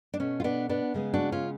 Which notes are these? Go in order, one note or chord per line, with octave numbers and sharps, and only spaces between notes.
D4
B2 A3 C#4
F4
B3 D4
B3 D4
C#3 G#3 B3
D4 F#4
C#4 F4